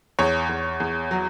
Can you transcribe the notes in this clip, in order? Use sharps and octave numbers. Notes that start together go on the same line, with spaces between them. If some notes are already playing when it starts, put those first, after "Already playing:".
E2 C#5
E2
E2
F#3